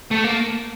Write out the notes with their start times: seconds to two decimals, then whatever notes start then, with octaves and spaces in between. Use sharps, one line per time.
0.11 A3
0.24 A#3